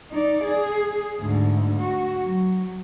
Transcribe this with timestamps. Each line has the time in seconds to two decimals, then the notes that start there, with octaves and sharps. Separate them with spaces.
0.11 D#4 D5
0.44 G#4
1.20 D2 G#2
1.80 F#4
2.22 F#3